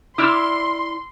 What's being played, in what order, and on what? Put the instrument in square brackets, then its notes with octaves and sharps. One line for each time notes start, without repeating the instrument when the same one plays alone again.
[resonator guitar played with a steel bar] E4 D5 [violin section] C6 [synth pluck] D6 E6 F6